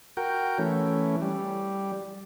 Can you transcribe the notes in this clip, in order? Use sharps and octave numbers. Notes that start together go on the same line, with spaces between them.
F#4 A#4 G5
E3 A3 C#4
G3